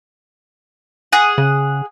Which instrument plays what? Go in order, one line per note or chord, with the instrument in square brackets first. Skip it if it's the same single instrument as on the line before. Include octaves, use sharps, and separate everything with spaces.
[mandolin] G#4 F#5
[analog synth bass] C#3